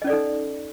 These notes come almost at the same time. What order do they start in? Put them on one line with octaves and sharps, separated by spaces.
D#5 C#4 D5 A4 D#4